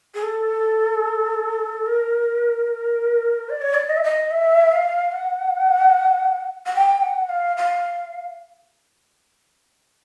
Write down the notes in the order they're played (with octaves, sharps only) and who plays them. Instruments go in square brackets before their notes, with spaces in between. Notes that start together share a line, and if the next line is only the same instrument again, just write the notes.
[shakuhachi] G#4
A4
A#4
D5
C#5
D5
D#5
E5
D#5
E5
F5
F#5
F#5
G5
F#5
F5
F5